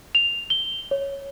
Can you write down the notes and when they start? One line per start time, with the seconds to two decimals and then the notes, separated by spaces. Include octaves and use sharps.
0.15 F7
0.50 G7
0.91 C#5